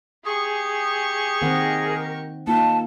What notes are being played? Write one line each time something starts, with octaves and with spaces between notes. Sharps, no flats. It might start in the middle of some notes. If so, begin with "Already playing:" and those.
G4 G#4 C#6
D#3 C4 A#4 F#5
A#3 D#4 F4 A5